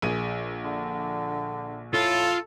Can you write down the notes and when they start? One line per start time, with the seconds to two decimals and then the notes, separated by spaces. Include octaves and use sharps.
0.02 A#1 G#4 D#7
0.65 D3
1.93 A2 F4 A4